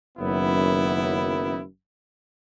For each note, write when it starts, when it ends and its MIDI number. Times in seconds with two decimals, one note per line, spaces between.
0.18 1.62 30
0.18 1.62 42
0.18 1.62 51
0.18 1.62 59
0.18 1.62 64